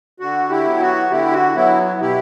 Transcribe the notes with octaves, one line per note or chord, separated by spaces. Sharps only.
D3 F#4
E4 G4
F#3 B3
F#4
D3 E4 G4
F#4
F#3 B3 E4
B2 E4 G4